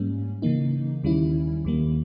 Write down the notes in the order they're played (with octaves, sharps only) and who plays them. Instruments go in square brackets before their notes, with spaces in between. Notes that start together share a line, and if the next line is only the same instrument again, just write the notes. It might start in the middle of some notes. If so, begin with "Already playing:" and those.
Already playing: [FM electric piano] G#2 G3 A#3 C#4
C#3 E3 A#3 D#4
D#2 D#3 G3 C#4 E4
D#2 D#3 G3 A#3